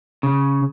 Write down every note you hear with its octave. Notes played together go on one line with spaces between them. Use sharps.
C#3